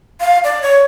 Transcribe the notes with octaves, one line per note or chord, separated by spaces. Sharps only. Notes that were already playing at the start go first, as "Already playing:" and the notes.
F5
D5
C#5